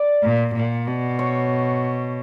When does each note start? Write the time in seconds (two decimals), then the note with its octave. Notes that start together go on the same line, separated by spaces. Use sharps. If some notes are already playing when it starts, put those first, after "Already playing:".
Already playing: D5
0.23 A#2
0.55 A#2
0.87 B2
1.19 C#5